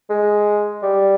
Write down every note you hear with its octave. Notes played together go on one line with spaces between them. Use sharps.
G#3
G3